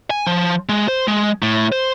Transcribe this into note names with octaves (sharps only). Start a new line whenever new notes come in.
G#5
F3
G#3
C5
G#3
A2
C5